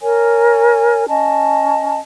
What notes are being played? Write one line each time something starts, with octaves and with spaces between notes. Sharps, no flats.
A#4 C#5 G#5
C#4 D#5 A5